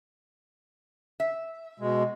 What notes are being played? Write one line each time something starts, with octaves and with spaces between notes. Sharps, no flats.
E5
B2 G#3